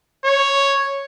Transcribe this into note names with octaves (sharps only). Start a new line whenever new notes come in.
C#5